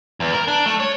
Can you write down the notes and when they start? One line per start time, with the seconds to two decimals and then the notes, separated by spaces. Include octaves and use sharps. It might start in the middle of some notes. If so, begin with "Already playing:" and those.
0.20 E2
0.34 A#4
0.48 D4
0.66 A3
0.80 C#5